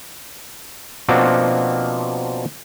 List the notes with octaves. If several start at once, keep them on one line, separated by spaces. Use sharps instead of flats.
B2 F3 A#3 C4 D4 F#4